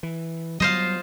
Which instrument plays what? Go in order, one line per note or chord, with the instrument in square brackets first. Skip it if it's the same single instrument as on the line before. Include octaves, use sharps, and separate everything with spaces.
[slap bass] E3
[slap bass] F#3 G3 B3 [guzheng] F4 C5 D#5